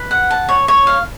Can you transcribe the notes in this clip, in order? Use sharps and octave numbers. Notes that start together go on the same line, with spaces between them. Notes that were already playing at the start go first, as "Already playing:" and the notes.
Already playing: B4
F#5
A5
C#5
C#5
F5